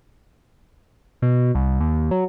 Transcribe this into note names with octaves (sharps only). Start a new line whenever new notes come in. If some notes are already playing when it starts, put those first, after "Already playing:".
B2
C2
D#2
F#3